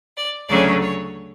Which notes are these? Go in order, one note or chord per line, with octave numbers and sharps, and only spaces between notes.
D5
D2 C#3 F#3 A3 C#4 D5
C#5